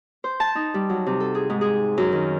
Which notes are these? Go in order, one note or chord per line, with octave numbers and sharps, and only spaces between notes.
C5
A5
D#4
G3
F#3
C3
A4
G#4
G#2
G#4
F#2
D#3